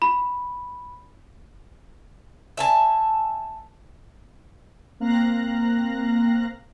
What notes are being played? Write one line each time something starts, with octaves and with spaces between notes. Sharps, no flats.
B5
E5 G#5 A5
A#3 C4 F5 A#5 F#6 A#6